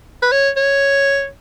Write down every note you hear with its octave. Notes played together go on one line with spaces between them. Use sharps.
B4
C#5
C#5